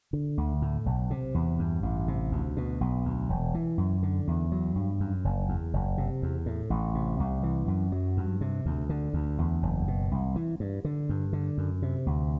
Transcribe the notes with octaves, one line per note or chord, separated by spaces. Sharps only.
D3
D2
A2
B1
C3
E2
G2
A1
C3
D2
B2
B1
D2
E1
E3
F#2
D3
E2
F#3
G2
F#2
F#1
E2
F#1
C3
E2
A2
A1
C3
C2
E3
F#2
F#3
G2
C3
D2
D3
D2
E2
F#1
B2
C2
E3
G2
D3
G2
D3
F#2
C3
D2